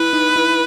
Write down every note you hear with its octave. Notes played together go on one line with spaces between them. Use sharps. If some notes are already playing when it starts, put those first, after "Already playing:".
Already playing: E4 B4
D#4
E4